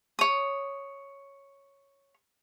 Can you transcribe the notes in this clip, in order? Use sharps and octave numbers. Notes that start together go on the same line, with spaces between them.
C#5 D#6